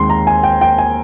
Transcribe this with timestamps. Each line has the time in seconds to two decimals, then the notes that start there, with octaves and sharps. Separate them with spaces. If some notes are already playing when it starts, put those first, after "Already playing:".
Already playing: D#2 D#3 G#3 C4 C6
0.10 A#5
0.27 G#5
0.43 G5
0.61 G5
0.78 G#5